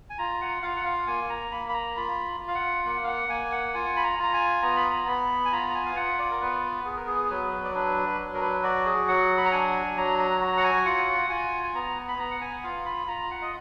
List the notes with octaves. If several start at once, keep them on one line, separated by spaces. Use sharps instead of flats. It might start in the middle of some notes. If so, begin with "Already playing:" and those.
G#5
F4 A#5
F#5
F4 F5
F#5
F5
A#3 G#5
A#5
A#3 B5
B5
A#5
F4 B5
F4
F5
F#5
A#3 F#5
F5
F#5
A#3 G#5
F#5
F4 G#5
B5
A#5
F4 A#5
G#5
B3 A#5
B5
A#5
B3 B5
G#5
F4 A#5
A#5
G#5
F5
F4 F#5
D5
A#4
B3 B4
B3 G#4
A#4
G#4
F#3 B4
D5
D4 B4
F#3
A#4
B4
F#4 D5
G#4
F#3 F#5
B5
A#5
D4 G#5
F#3 A#5
A#5
F#4 A#5
F#5
G#5
F4 F#5
F4 G#5
G#5
B3 A#5
B5
B3 A#5
F#5
G#5
F4 F5
B5
F4 A#5
F#5
D#5